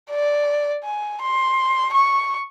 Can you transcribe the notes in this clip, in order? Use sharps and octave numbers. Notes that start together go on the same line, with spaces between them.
D5
G#5
C6
C#6